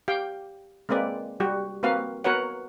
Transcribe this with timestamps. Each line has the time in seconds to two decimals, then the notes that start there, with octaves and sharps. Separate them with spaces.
0.08 G4 F5 G5
0.89 G#3 A#3 C4 B4 D5
1.40 G3 F#4 G4
1.83 A#3 C4 F#4 B4 F5
2.24 B3 F#4 A#4 B4 C#5 F#5